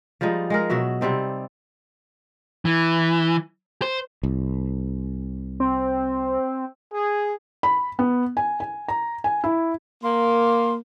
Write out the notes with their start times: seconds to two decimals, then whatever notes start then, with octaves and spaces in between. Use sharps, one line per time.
0.21 F3 G3 G#3 D#4
0.50 G#3 G#4 A#4
0.70 B2 F#3 F#4 E5
1.01 C3 G3 C4 D#4
2.65 E3
3.82 C5
4.23 C2
5.60 C4
6.94 G#4
7.63 B5
7.99 B3
8.37 G#5
8.60 G#5
8.88 A#5
9.24 G#5
9.44 E4
10.03 A#3 C6